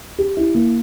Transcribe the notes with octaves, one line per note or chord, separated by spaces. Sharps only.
G4
E4
A#3